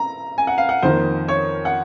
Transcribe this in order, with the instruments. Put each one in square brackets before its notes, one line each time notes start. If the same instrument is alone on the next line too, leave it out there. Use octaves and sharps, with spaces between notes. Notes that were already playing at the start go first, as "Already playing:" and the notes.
Already playing: [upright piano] A#5
G#5
F#5
F5
F#5
F2 D#3 A#3 C5
C#5
F#5